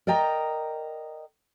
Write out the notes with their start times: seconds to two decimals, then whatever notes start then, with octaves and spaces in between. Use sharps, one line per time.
0.07 A#4 D5 D#5 G5 A#5